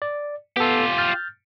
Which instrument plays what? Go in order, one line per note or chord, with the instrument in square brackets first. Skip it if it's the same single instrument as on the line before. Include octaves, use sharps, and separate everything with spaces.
[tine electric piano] D5
[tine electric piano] B3 A4 [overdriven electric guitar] F4 G4
[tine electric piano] F6 G6 A6